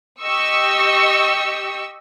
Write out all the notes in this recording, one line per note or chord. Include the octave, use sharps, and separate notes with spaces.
G4 D#5 C#6 E6